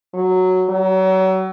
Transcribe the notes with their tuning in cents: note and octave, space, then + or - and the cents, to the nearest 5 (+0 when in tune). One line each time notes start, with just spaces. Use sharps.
F#3 +0
F#3 +35